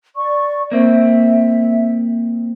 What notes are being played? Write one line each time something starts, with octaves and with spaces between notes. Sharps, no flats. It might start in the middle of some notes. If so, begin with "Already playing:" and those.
D5 C#6
A#3 C4 E5